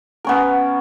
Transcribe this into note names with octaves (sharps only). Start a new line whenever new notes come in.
B3 C#4 A#4